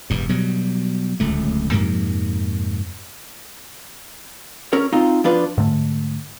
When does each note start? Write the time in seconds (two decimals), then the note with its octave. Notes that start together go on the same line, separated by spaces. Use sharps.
0.10 E1 G2
0.29 B2 F#3 G3
1.20 D1 C#2 A3
1.72 F2 G#2 C3 A#3
4.73 C#4 A#4 C#5
4.93 C4 D#4 F4
5.24 F3 B3 D4 F4 B4 D5
5.58 G#2 D3 A3